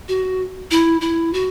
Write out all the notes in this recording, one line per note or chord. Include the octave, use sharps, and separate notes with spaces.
F#4
E4
E4
F#4